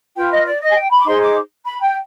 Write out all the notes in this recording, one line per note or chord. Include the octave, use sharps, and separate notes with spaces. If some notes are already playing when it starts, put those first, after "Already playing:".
F4 B4 G5
D#5
D5
D#5
G#5
G5
B5
D6
D#4 G#4 C5 C6
D6
B5
G5